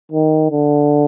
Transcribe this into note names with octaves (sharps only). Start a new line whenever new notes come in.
D#3
D3